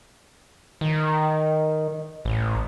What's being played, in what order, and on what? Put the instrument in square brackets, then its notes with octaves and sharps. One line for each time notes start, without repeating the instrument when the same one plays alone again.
[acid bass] D#3
A1